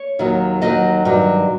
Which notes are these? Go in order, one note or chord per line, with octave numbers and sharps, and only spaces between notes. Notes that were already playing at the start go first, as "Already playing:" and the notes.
Already playing: C#5
D#2 D#3 F#3
D#2 D#3 F#3 D#5
G2 D#3 F#3